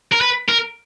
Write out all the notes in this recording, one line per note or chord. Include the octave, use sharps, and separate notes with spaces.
A#4
B4
A#4